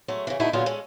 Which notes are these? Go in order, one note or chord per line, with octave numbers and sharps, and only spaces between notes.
F#3 G#3 A3
C#3 E3
B2 D3 A3 D#4 E4
A#2 D3 F#3 B3 F4 G#4
G#3 C#4 A4